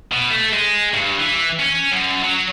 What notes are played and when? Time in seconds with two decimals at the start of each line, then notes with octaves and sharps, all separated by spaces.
0.12 B2
0.31 A3
0.53 G#3
0.94 G2
1.18 E3
1.60 C#4
1.92 F#2
2.24 F#3